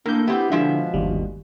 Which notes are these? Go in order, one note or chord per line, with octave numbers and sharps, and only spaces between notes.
A2 A#3 D4 G6
B3 C4 E4 G4 G6
B2 D3 F3 G#3 E5
G1 D#2 G3